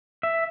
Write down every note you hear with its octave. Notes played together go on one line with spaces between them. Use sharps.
E5